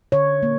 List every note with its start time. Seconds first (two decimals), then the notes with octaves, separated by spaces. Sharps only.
0.12 D3 C#5
0.43 A#3